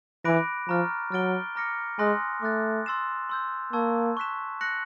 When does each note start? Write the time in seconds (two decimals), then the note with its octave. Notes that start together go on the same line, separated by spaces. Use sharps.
0.25 E3 B5 D6 F#6 A#6 D7
0.69 F3 A#5 C#6 F6 A6
1.11 F#3 F6 A6 D7 G7
1.55 A#5 D6 F6 A#6 C#7
1.99 G#3 G#5 C6 D#6 F#6 A#6
2.42 A3 D6 F#6 A6
2.86 C6 E6 A6 C7 E7
3.29 C6 E6 G6
3.73 A#3 A5 C#6 E6 G#6
4.17 C#6 F#6 B6 E7
4.61 F#6 A#6 C#7 F#7